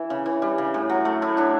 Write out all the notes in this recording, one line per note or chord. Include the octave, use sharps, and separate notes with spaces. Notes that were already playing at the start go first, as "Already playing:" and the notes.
Already playing: E3 E4
C#3
E3
G3
C#3
A2
F#3
A3
A2 E4
A2 D4